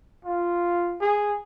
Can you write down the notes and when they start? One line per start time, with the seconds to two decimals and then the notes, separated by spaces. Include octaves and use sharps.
0.25 F4
1.01 G#4